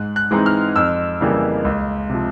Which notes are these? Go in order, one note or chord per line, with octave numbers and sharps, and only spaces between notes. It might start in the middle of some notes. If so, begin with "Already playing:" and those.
Already playing: G#2 F#6
F#6
E3 G#3 C4 D#4
F6
F2 E6
C#3 E3 G3 A#3
C#2
C3 F3